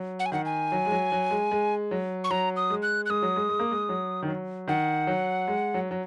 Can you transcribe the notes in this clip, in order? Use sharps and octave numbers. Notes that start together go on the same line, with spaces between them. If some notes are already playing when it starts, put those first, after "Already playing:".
Already playing: F#3
F#5
G#5
D#3 F#5
G#5
F#3
G#3
F#3
F#3
G#3
G#3
F#3
C#6
F#3 A#5
D#6
G#3
F#6
F#6
G#3 D#6
F#3
G#3
G#3
A#3
G#3
F#3
D#3
F#3
D#3 F#5
F#3
G#3
F#3
F#3